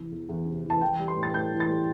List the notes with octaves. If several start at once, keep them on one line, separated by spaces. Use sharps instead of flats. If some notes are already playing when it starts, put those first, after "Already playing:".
Already playing: C3 E3
E2
E2
C3
E3
A5
E3 G5
G3
C6
A2
A6
A2 G6
E3
A6
G3